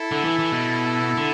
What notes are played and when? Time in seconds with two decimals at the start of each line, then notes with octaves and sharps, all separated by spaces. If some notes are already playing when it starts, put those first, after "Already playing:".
Already playing: E4 A4
0.11 D3
0.25 E3
0.39 E3
0.52 B2
1.17 D3